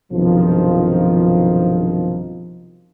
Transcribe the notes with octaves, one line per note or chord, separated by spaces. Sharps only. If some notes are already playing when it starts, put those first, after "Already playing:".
B1 G2 C3 D#3 F3